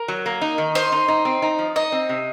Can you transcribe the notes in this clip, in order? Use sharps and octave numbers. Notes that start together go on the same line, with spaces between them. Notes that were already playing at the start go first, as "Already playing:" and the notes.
Already playing: A#4
F#3
A#3
D#4
D#3
D#4 C5
D#4
D#4
C4
D#4
F3
D#4 D#5
C4
C3